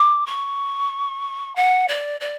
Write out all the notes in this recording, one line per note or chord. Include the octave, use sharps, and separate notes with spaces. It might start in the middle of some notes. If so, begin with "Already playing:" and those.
Already playing: D6
C#6
F#5
D5
D5